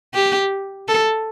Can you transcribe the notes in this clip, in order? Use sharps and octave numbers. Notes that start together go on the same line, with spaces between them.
G4
A4